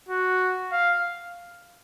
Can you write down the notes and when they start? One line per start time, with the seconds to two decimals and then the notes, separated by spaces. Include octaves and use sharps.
0.08 F#4
0.72 F5